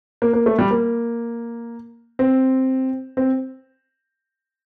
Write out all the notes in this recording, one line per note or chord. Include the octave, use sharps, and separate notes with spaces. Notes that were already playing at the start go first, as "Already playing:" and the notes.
A#3
A#3
A3
G3
A#3
C4
C4